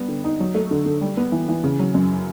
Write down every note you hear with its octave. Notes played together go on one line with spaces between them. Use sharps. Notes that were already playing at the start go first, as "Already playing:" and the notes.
Already playing: G3 B3 D4
D3
D#4
F#3
A3
D3
D3
G3
B3
E3
E3
C#3
F#3
F#2